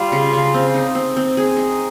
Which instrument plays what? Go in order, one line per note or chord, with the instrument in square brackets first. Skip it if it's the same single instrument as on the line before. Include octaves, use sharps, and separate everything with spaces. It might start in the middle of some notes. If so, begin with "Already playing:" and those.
Already playing: [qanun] G3 [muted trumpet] F4
[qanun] C#3
C#3
C4
D#4
C4
C4
G#4
D#4